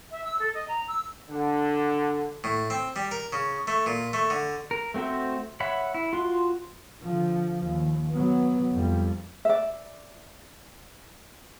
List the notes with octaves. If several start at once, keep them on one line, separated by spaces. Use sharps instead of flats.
E5
E6
A4
D#5
A#5
E6
D3
A2
C4
G3
A#4
C#3
A3
A#2
A3
D3
A#4
A3 C4 F#4 C5 E5
C#5 E5 F#5 B5
E4
F4 F#4 C6
D3 F3
D#2
F#3 B3
F2 G3
D5 E5